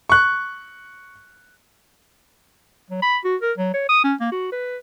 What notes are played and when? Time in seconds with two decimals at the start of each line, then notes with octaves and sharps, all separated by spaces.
0.09 C#6 F#6
2.90 F#3
3.02 B5
3.25 F#4
3.42 A#4
3.58 F#3
3.74 C#5
3.89 D#6
4.04 C#4
4.20 A#3
4.32 F#4
4.52 B4